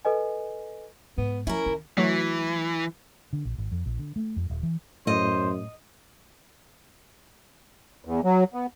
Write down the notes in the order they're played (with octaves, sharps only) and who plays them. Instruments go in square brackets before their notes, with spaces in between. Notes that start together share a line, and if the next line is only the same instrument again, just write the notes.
[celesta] A4 B4 D#5 G#5
[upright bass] G#2 [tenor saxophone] B3
[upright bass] F3 [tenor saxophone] C#4 [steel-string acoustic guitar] E4 A#4
[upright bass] D#3
[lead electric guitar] E3 [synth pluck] F#3 A3 F#4
[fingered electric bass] D3
A#1
G#1
F2
A#1
D3
A3
F2
D#1
E3
[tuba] F#2 [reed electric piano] A2 [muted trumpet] C5 [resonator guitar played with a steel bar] D#5
[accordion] E2
F#3
B3